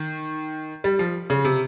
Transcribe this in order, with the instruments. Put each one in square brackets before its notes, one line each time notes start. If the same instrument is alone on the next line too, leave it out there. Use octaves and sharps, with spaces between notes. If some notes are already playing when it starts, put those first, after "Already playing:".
Already playing: [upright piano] D#3
G3
F3
C#3
C3